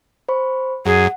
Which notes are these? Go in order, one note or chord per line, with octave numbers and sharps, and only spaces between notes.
C5 B5 C#6
F#2 G#4 F#5